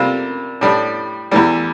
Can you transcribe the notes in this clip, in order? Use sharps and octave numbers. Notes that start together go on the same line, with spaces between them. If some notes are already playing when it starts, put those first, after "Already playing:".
Already playing: C3 G3 A#3 F4
A2 G3 D4
E2 E3 G3